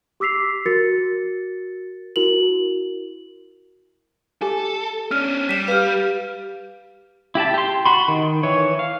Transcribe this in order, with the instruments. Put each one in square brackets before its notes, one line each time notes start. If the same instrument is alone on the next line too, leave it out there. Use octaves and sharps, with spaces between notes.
[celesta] G4 D6 E6 B6 C7 F7
F#4 A#4 A6 C#7
E4 F#4 A#4 F7 F#7
[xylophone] G4 G#5 [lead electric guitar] A4
[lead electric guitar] C#4 D4 [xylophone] F6
[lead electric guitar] G3 [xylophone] B6 E7
[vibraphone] G4 F5 [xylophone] B4 F6
[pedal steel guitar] E4 G4 E5 A5
G4 C6
F#4 B5 C6
D#3
E3 C#5
F5